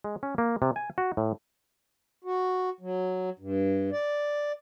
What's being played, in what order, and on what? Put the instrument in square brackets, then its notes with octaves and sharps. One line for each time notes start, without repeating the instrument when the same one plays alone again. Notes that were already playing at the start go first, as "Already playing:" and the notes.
[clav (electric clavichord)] G#3
C#4
A#3
C3
G#5
F#4
A2
[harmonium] F#4
F#3
G2
D5